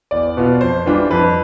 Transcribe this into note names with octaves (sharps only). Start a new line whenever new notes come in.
E2 D5
B2 B3 F4
F2 C5
E3 G3 D4 F4
F2 B4